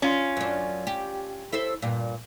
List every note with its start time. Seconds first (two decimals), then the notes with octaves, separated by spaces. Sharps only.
0.02 C#4 F4
0.37 F#2 D4
0.87 G4
1.53 E4 A4 C5
1.82 G2 A#2